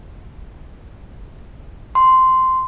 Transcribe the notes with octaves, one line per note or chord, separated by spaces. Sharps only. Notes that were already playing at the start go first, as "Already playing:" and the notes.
C6